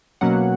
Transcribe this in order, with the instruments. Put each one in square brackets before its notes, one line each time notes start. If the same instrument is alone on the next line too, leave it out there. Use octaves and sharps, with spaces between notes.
[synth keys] B2 F#3 A#3 C#4 F#5